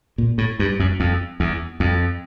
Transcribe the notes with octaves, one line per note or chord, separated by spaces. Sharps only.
A#2
A2
G2
F#2
F2
E2
F2